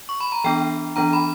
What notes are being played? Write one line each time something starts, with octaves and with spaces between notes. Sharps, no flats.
C#6
B5
A#5
E3 B3 D4 G5
E3 B3 D4 A#5
B5